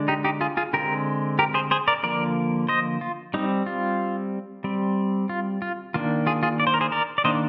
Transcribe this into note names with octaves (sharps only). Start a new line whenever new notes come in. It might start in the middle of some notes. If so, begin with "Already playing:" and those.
Already playing: D3 G#3 D4
D#4 G4
D#4 G4
F4 G#4
F4 G#4
D3 G#3 C4 G4 A#4
G4 A#4
G#4 C5
G#4 C5
A#4 D5
D3 F3 A#3 A#4 D5
C5 D#5
F4
G3 C4 D#4
F4
G3 C4
F4
F4
D#3 A#3 D4 F4
F4 G#4
F4 G#4
D5
C5
A#4
G#4 C5
A#4 D5
D5
D#3 A#3 D4 C5 D#5